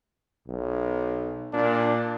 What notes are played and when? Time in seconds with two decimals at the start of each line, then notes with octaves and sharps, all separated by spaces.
0.48 B1
1.53 A#2 D4